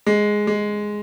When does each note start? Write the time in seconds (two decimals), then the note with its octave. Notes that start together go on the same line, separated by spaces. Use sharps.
0.07 G#3
0.47 G#3